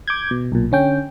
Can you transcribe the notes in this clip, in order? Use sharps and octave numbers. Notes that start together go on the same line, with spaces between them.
D6 G6 G#6
B2
B1 A#2
D3 C#4 G5